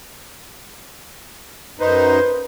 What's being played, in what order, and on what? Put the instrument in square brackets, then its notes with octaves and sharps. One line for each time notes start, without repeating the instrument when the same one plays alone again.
[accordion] F#2 D#4 [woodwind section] B4 C5